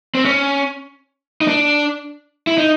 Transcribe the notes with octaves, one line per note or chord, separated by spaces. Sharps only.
C4
C#4
D#4
D4
E4
D#4